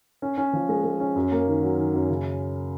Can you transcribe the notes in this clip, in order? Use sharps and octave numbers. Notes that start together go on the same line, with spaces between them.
C#4
C#4
F3
G#3
G#3
C#4
F#2
A#3
D#3
F#3
D#3
F#2
C#3